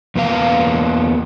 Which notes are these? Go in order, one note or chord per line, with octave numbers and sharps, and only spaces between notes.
E2 A#3 B3 D#4 F5